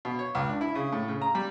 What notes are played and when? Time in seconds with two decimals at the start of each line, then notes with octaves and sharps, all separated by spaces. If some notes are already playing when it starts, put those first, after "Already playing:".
0.05 B2
0.19 C#5
0.35 C#2
0.49 D4
0.61 E4
0.75 C#3
0.92 A2
1.08 C#3
1.21 A#5
1.35 G3